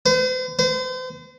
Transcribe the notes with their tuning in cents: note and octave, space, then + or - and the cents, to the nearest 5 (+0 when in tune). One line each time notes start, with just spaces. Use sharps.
C5 -45
C5 -40